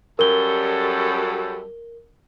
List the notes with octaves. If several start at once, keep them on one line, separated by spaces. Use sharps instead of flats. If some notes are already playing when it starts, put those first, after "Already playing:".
F#2 G3 A4 A#4 G7